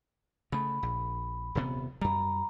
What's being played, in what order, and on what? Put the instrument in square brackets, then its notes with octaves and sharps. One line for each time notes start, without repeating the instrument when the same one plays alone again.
[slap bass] C#3 A3 [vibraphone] B5
[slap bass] A#1
D#1 C3 B3
[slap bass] F#2 G3 [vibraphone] A#5 B5